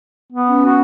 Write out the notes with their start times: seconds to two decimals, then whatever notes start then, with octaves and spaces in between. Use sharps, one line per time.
0.33 B3
0.48 C#4
0.66 F#4